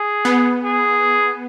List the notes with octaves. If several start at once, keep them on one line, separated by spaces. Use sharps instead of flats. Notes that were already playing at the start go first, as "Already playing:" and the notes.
Already playing: G#4
B3
G#4